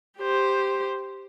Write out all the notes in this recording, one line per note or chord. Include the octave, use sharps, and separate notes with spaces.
G4 C5